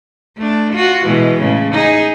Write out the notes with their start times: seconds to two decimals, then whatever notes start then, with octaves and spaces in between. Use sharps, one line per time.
0.37 A3 D4
0.74 F4 F#4
1.05 B2 E3 G#3
1.41 A2 C#3
1.73 D#4 G#4